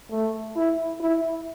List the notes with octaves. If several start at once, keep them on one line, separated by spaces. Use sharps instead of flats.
A3
E4
E4